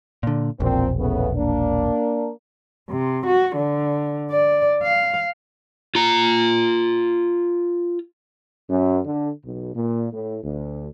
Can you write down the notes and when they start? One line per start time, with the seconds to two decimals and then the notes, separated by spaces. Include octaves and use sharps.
0.23 A#2 D3
0.60 E1 A#1 A#2 C4
0.98 A2 C#3 B3
1.35 A#3 D4
2.90 C3
3.27 F#4
3.56 D3
4.31 D5
4.83 F5
5.95 F4 A#5
8.69 F#2
9.05 D3
9.44 B1
9.75 A#2
10.12 A2
10.44 D2